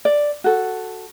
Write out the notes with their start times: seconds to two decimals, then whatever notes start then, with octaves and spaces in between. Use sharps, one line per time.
0.05 D5
0.44 F#4 A4